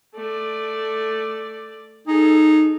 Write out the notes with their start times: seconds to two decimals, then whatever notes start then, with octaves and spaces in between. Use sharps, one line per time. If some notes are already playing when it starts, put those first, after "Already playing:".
0.15 A3 D5
2.07 D#4 G#4 A4